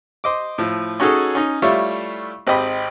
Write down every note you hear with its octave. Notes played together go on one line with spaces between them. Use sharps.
C5 D#5 D6
A2 F3
C#4 D#4 F#4 G#4 A4 C#5
C#4 D#4
G3 A3 E4 F4 C#5
G#1 C4 G4 D#5 B5